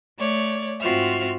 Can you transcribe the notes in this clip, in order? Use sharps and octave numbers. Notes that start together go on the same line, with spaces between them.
A3 C#5 D5
G#2 C4 F4 F#4 E5 F6